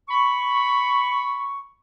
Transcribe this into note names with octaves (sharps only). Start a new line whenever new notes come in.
B5 C#6